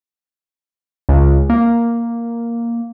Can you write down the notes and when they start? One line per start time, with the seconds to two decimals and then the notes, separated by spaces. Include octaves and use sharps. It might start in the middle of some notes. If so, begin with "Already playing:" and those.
1.09 C#2
1.50 A#3